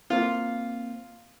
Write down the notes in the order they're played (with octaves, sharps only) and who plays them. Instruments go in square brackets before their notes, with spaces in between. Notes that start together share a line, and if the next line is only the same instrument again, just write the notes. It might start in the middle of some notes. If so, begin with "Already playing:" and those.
[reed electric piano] A#3 C4 [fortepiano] F4